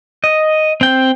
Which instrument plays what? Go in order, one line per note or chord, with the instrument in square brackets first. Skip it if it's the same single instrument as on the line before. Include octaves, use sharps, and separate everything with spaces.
[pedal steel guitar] D#5
C4 G5